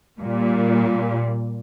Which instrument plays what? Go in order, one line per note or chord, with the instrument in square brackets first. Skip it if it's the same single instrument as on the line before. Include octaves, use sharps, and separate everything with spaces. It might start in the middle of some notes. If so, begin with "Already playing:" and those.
[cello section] A#2 G3